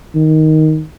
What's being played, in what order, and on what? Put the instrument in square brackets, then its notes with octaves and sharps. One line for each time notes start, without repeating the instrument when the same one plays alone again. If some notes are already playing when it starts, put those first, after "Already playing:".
[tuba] D#3